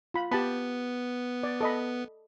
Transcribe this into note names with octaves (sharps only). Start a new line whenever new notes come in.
F4 B5
B3 G4 A5 B5
D5
A4 D#5 B5